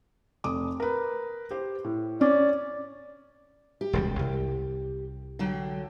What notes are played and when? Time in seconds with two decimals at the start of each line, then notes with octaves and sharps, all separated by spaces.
0.44 F1 D6 D#6
0.80 A#4 B4
1.51 G4 C5
1.84 A2
2.21 C#4 D5
3.81 G4
3.93 E1 C#2 G3
4.19 C2
5.39 D3 F#3 G5